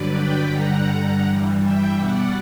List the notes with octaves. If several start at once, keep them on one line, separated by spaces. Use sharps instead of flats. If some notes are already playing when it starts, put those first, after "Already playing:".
Already playing: G2 D3 F#3 B4 D5
G5 B5
G2 D3 G3 F#5 A#5
G2 E3 G3
E5 G5
B2 G3 D5 F#5